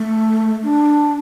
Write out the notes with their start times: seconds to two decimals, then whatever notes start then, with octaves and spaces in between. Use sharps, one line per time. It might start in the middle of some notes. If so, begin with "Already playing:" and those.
Already playing: A3
0.63 D4